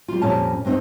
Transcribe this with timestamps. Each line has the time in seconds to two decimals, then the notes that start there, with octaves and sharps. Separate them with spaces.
0.08 G3 F4
0.22 F2 A#2 G3 C#4 A5
0.65 G2 C4 D#4